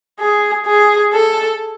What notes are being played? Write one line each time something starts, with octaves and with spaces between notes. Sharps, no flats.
G#4
G#4
A4